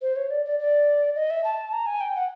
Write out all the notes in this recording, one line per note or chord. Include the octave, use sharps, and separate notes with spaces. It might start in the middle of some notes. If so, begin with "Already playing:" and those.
C5
C#5
D5
D5
D5
D#5
E5
A5
A#5
G#5
G5
F#5